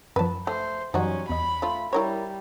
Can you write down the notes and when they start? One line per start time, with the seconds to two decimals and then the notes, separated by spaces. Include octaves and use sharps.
0.16 F#2 F3 B4 A5
0.47 A3 C5
0.94 F#2 E3 F#3 G3 C#4 D#4 F#4
1.29 E2 D#5 B5
1.62 A3 F4
1.93 G3 E4 A#4 C#5